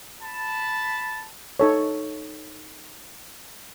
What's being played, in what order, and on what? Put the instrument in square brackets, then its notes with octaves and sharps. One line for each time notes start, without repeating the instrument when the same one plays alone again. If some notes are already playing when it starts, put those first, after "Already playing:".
[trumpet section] A5 B5
[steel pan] D#4 A4 C#5